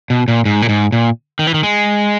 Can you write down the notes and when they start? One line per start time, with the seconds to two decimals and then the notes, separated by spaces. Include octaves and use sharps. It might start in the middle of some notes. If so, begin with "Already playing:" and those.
0.10 B2
0.28 A#2
0.45 G#2
0.62 A#2
0.69 G#2
0.92 A#2
1.39 D#3
1.47 E3
1.54 D#3
1.63 G#3